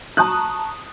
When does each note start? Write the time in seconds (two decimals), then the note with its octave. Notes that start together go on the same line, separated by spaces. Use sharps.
0.17 A5 A#5 C#6 D#6 F#6